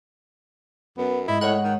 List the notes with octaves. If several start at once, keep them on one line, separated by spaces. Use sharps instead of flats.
F#2 B3
G#2 E4 D#5
A2 C#5 F#5
D#3